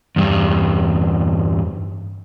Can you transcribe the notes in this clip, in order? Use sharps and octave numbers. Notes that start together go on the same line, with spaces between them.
E2 G2